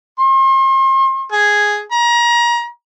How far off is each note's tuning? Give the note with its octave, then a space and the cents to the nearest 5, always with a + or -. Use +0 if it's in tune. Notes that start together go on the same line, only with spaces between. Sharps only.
C6 +40
G#4 +0
A#5 +30